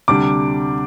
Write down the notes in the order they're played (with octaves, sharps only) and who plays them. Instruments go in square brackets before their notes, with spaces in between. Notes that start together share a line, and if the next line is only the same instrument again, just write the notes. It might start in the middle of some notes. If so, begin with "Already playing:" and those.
[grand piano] D2 C3 G3 D4 D6